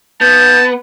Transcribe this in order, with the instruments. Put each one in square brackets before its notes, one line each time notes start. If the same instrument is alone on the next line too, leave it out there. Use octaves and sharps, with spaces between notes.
[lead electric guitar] B3 [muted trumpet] A5 [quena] G6